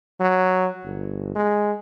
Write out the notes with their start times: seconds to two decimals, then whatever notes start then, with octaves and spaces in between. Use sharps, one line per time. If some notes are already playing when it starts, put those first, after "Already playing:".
0.20 F#3
0.84 G1
1.35 G#3